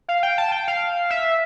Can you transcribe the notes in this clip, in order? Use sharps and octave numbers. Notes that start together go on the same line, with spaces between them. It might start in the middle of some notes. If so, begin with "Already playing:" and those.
F5
G5
A5
G5
F5
E5